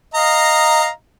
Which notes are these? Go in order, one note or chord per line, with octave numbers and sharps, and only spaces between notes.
D#5 F5 A#5